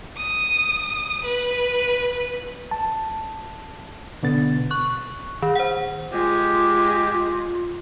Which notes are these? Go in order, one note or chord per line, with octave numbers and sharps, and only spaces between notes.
D#6
B4
A5
B2 D3 B3 A6
C#6 F#6
D#3
C5 F#5
G#3 F4 G4